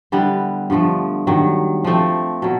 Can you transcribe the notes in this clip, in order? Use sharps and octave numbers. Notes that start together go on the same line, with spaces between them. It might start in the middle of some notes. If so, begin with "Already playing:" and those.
D3 G3 B3 E4
G2 D3 F3 A3
G2 D#3 F#3
F3 A3 C4
B2 F#3